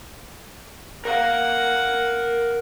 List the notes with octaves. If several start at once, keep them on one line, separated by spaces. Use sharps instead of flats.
A#4 F5 F#5